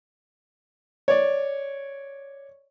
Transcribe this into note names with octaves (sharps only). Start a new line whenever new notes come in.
C#5 D5